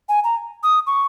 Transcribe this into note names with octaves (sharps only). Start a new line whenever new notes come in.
G#5
A#5
D#6
C#6